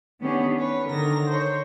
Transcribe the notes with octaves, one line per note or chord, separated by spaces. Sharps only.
D#3 B3 C#4 D4 G4 G#4
B4 C#5
D3 D#3 A#4 A#6
C5 C#5